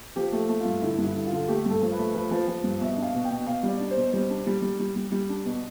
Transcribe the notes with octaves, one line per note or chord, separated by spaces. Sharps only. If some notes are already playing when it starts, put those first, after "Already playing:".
F3 G4
A3
A3
G2 F4
D3 E4
G2
E4
D3
F4
D3
A3 G4
G2 A4
F3
B4
A3
F3 B4
F3
F3
G2
B2 E5
D4
F5
B2
G5
B2
B2 F5
G3
D5
D4
C5
B2
G3 C5
D4
G3
G3
G3
G3
G3
D4
B2